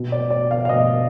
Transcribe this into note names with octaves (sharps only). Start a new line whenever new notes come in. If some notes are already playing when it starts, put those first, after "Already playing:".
Already playing: B2
D5
D5
F5
F5
B2 D#5